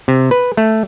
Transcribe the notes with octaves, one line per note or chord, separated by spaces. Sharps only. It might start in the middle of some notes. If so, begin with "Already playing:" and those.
C3
B4
A3